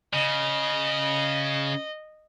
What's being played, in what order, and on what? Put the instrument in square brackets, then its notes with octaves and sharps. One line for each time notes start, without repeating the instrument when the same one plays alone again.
[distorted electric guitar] C#3 [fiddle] D#5